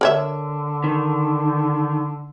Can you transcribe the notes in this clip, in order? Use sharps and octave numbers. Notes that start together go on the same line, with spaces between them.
D3 A#4 C#5 E5
D#3